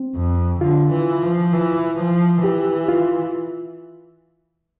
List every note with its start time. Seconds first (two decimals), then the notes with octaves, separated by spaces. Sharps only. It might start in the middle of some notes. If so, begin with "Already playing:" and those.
Already playing: C4
0.15 F2
0.60 D3 F4
0.92 E3
1.22 F3
1.53 E3
1.98 F3
2.43 E3 G4
2.89 F4